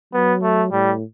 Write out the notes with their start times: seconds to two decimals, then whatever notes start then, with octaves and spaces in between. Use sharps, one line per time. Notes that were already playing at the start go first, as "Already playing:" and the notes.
0.13 F#3 B3
0.43 A3
0.72 A2 G3